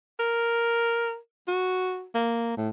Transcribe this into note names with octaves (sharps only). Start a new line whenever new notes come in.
A#4
F#4
A#3
A2